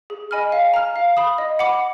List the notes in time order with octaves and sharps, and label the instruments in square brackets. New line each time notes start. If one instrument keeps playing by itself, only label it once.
[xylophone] G#4
D#5 G#5 B5 F6
F5
A#5 F6
F5
B5 D#6
D#5
F#5 B5 D6